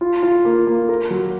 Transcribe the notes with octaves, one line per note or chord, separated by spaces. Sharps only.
F4
F4
A#3
A#3
A#4
F#3